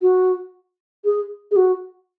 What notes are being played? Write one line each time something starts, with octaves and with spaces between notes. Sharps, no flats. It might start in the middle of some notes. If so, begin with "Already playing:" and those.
F#4
G#4
G#4
F#4